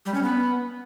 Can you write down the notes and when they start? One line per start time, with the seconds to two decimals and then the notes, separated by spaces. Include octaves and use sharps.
0.06 G3
0.14 C#4
0.23 B3